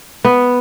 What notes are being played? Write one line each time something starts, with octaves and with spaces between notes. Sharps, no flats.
B3